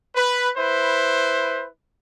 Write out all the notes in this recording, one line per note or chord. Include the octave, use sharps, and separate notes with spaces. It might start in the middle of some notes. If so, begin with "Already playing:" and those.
B4
E4 B4 C5